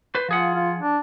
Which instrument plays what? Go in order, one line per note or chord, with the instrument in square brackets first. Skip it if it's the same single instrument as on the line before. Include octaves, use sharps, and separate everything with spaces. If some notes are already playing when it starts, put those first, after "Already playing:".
[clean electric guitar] B4 C5
[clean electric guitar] F3 G#4 F#5 [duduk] F4
[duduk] F4
D4